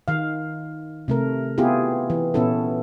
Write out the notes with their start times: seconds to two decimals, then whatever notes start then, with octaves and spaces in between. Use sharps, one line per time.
0.08 D#3 F5
1.08 C3 A3 A#4
1.58 B3 E4 F4 G4 G#4
2.10 E3
2.34 A#2 B3 C#4 E4 A4